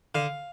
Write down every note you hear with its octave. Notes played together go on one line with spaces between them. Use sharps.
D3 F5